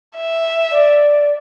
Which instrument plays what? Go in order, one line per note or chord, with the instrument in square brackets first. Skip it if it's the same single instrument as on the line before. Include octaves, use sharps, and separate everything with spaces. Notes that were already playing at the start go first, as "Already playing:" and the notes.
[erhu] E5
[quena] D5